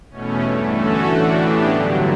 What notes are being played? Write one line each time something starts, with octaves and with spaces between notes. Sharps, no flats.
E2 B2 A3 C#4
G2 E3 A3
D3 A3 C#4 F#4 A4
A2 E3 A3 D4 F#4
A2 E3 B3 D4 G4
G2 D3 F#3